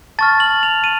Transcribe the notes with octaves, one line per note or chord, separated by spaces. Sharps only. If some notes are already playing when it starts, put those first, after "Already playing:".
A5 C#6 F6 A6
F#7
F7
D#7